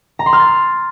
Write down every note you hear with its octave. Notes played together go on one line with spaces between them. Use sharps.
A#5
C6
F6
A6